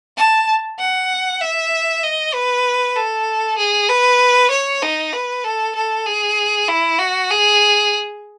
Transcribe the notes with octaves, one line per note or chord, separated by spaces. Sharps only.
A5
F#5
E5
D#5
B4
A4
G#4
B4
C#5
D#4
B4
A4
A4
G#4
E4
F#4
G#4